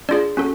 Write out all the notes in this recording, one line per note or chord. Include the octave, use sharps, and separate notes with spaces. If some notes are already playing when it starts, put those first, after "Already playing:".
D4 F4 G#4 D5
C#4 F#4 A4